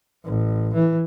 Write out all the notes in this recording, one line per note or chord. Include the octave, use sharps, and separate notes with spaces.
A1
E3